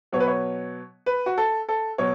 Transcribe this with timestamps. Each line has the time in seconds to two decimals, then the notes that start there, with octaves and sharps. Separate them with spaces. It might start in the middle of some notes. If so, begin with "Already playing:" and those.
0.12 B2 F#3 B3 C#5
0.20 B4
0.27 C#5
1.06 B4
1.26 F#4
1.38 A4
1.69 A4
1.98 B2 F#3 C#5